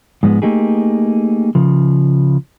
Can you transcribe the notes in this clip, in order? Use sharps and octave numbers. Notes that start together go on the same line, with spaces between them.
G#2 F3 G#3 B3
A3 A#3 D#4 G4 G#4
C#3 F3